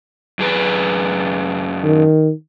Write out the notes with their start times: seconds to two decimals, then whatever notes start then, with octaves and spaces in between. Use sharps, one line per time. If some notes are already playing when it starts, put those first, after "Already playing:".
0.39 F#2 G#4 B4
1.84 D#3